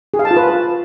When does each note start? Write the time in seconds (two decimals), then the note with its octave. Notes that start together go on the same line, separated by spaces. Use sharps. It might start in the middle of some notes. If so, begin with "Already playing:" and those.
0.14 G#4
0.19 F5
0.25 A5
0.31 F4
0.37 B4